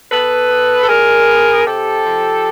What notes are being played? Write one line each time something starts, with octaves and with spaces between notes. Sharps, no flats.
B3 A4 B4
B3
A4
A#2 G#4 A#4
B3
C3 G4 A4
F3